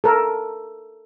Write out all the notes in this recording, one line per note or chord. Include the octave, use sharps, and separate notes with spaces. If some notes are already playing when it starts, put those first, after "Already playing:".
A4 A#4